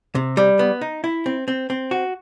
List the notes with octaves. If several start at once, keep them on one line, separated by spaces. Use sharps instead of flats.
C3
G3
B3
D#4
E4
C4
C4
C4
F#4